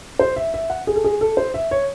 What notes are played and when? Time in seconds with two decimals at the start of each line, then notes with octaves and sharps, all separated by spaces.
0.19 C5
0.36 E5
0.54 E5
0.70 F#5
0.87 G#4
0.96 A4
1.04 G#4
1.21 A4
1.37 C5
1.54 E5
1.71 C#5